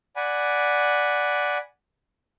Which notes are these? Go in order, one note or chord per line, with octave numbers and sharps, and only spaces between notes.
D5 F#5 G#5 B5